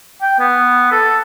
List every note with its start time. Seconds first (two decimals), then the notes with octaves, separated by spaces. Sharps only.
0.22 G5
0.39 B3
0.91 A4